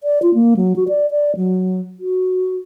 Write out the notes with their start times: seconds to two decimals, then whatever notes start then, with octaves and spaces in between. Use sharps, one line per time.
0.04 D5
0.23 F4
0.34 A#3
0.57 F#3
0.76 F#4
0.88 D5
1.11 D5
1.37 F#3
2.00 F#4